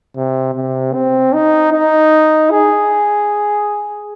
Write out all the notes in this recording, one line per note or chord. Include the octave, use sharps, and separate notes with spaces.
C3
C3
C4
D#4
D#4
G#4